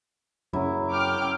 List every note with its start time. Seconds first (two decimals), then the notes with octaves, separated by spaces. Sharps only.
0.53 F#2 C#3 F#3 E4
0.92 G5 D6 F6